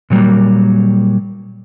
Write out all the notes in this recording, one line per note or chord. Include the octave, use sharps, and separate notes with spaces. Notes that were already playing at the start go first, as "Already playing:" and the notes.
A#2 F#3 G3 A#3